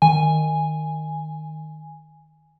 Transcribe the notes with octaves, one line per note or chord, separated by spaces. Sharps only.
D#3 G#5